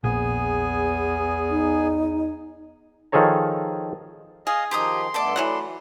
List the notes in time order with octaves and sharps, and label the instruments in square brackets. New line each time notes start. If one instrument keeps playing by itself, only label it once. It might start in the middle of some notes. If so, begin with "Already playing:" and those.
[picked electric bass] A#1 [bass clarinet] E2 [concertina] B3 G#4 G#5
[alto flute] D#4
[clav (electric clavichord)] D#3 F3 G#4 A4 C#5 A#5
[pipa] G#4 [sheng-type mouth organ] D#5 F5
[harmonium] D#3 F3 D#4 [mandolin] G4 A#5 D#6 [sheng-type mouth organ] C6
[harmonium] G2 A3 B3 [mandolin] A4 D5 D6
[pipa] E3 F#3 F#5 [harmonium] A3 E4